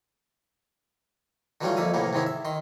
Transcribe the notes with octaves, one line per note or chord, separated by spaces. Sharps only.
D3 E3 F#3 G3 A3 F4
F2 D3 A#3 E5 D#6
A2 C3 E3 A#3 B3
G#2 C3 D#3 E3 G#3 E4
E5
D#3 C6